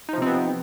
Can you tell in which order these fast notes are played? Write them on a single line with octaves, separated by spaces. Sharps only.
D#4 F3 C3 C4 B3